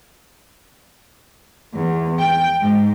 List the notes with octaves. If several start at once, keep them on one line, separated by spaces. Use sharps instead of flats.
E2
G5
G#2